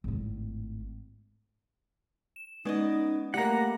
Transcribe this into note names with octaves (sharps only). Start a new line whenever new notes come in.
G#1 A2
E7
G#3 B3 C#4 D#4 D5 D#5
G3 A3 A#3 F#5 A#5 F#6 A#6 C#7